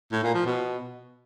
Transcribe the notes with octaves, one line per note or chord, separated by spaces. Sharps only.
A2
A#2
F3
B2